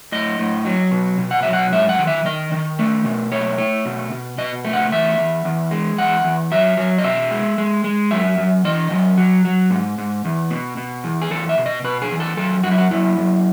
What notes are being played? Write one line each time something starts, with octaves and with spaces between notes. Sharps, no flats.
A2 D#5
A2
F#3
B2
B2
F#5
F#3 E5
F#5
G#2 E5
F#5
D#3
E5
D#3 D#5
D#3
A3
B2
A3 C#5
A3
B2
B2
B2 D#5
A3
F#5
E2 E5
E2
E2
G#3
E2 F#5
E2
F#3 E5
F#3
D#5
B2 E5
G#3
G#3
G#3
F#2 E5
F#2
E3 D#5
F#2
F#3
F#3
G#2
G#2
E2
B2
B2
E2
G#4
E2 A4
E5
B2
D#5
B2 B4
G#4
E2
A4
F#2 A4
F#2 F#4
E4
F#4
F#2 E4
F#2